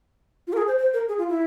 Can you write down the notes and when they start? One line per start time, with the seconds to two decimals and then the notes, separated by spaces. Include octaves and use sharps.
0.47 F4
0.53 A#4
0.57 G#4
0.68 C5
0.78 C5
0.94 A#4
1.08 G#4
1.18 F4
1.29 E4